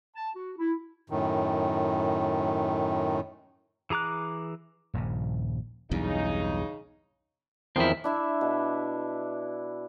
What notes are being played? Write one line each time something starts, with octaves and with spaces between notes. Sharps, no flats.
A5
F#4
E4
F#2 A2 D#3
E3 G#4 A#5 D6 F#6
D#1 A#1 G2 C#3
B1 E2 G2 C#3 D#4
E2 D#3 F3 C4 E4
D4 E4 E5
B2